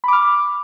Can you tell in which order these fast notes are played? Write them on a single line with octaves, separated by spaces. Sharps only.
B5 D6 F6